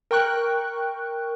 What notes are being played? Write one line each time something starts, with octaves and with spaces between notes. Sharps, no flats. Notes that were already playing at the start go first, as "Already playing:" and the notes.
A#4 G5 C#6 F#6